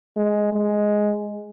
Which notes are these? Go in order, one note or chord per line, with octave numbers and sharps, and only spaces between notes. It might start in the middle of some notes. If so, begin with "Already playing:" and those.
G#3
G#3